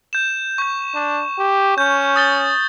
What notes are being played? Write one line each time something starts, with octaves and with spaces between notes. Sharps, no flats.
G6 E7
C#6 G6
D4
G4
C#4 G6
D#6 A6 G7